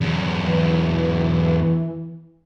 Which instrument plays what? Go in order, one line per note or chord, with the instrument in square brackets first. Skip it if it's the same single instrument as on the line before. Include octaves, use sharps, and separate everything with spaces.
[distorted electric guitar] E2 F#3
[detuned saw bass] E3